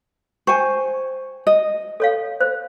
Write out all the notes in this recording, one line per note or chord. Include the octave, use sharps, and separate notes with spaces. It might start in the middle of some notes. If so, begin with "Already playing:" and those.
C5 G5 G#5 C#6
D#5
A4 C#5 F5
C5